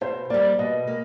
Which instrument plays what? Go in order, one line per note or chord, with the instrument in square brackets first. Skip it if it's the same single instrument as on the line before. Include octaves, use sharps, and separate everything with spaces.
[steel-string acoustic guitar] B2 [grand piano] C5
[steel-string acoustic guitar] G3 A#3 [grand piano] D5
[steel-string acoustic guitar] B2 [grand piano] D#5
[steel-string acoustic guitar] A#3